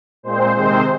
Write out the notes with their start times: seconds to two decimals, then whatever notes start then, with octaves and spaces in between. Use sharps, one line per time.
0.23 A#2 G#3 C4 C5
0.55 C3 D#3 G#3 C4 C5